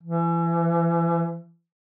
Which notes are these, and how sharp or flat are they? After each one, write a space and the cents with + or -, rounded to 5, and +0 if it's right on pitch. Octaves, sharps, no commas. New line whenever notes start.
E3 +35